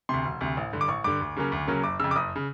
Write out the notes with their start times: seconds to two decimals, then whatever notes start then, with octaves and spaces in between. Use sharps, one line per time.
0.09 D2 C3 C6
0.25 E1
0.41 D2 C3
0.57 A1
0.73 G2 D3
0.81 D6
0.88 A1 C#6
1.04 G2 D3 D6
1.21 D2
1.37 C#3 F#3 A#3 C#4
1.52 D2
1.67 C#3 F#3 A#3 C#4
1.84 F#1 D6
1.99 F2 C#3 E6
2.11 D6
2.16 F#1 D#6
2.36 C#3